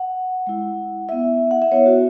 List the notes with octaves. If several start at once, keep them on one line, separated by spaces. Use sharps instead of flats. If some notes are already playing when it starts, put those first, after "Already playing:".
Already playing: F#5
G#3 E4
B3 E4 E5
F#5
E5
B3 E4 C#5
F#4